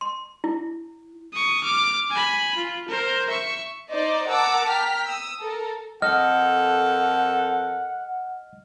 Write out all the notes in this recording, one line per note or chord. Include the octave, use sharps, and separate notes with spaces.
C6
E4
C#6 D#6
D6 F6
G#5 B5
F4
A#4 C5
E5 C#6
D#4 C5 D5 D#5
A#4 F#5 A5 A#5 D6 E6
G5 A#5 F6 B6
D#6 E6
A4 A#4
F2 A4 A#4 D#5 F#5 F6